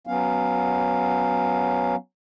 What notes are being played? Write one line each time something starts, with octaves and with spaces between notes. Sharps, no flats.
F#3 B3 C#4 F5